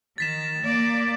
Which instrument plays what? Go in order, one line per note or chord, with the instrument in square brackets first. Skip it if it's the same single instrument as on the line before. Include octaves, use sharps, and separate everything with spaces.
[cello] D#3 [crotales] A6 B6 E7
[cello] A#3 D5